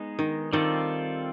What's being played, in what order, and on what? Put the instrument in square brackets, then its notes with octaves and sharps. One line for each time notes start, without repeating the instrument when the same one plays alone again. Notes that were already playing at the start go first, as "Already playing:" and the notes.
Already playing: [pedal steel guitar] G#3 B3 D#4 G#4
[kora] D#3
[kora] D#3 [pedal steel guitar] G3 C4 F4 A4 D5